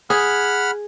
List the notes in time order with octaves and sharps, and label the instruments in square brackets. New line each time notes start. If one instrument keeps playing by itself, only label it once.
[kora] G#4 [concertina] F#5 B5 F6